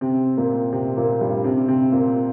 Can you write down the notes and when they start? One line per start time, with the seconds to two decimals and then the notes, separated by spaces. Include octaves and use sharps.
0.01 C3 C4
0.37 A#2 A#3
0.73 C3 C4
0.97 A#2 A#3
1.21 G2 G3
1.44 C3 C4
1.68 C3 C4
1.92 A#2 A#3